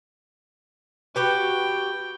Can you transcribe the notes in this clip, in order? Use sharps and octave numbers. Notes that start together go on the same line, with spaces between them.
F#4 G4 B4 G5